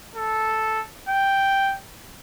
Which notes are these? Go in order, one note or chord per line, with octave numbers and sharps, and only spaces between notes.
A4
G5